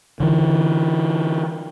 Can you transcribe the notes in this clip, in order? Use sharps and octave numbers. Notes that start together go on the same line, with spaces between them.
D3 E3